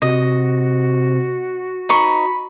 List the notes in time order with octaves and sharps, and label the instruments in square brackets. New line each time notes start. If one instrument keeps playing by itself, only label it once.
[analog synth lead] C3 [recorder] F#4 [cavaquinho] D#5
[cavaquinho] D#4 C5 C#6 [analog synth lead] B5